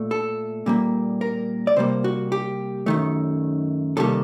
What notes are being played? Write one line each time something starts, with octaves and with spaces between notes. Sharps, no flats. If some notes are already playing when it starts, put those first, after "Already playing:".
Already playing: A#2 A3
A4
A#2 G3 A#3
A#4
D5
C3 G3 A#3 C5
F#4
G4
F#2 D#3 A3
C3 D#3 G3 A#3 A4